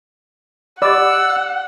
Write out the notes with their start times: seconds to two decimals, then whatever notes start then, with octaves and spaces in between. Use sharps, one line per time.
0.82 G4 D5 D#5 F#5 B5 E6